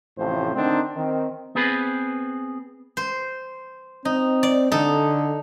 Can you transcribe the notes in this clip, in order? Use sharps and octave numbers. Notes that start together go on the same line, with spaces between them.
A1 F2 A2 C3 F3 C5
D3 D#3 C4 D4 D#4
D#3 C4
B3 C4 G#4 B4
C5
C4 D#4
D5
D3 D#4 A4